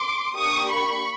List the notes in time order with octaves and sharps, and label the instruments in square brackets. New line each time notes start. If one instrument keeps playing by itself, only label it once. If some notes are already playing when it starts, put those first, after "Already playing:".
Already playing: [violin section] C6 D6
A#3 D4 G4 C#6 D#6
B5 C#6